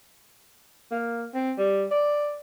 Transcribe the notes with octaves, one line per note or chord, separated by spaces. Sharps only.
A#3
C4
G3
D5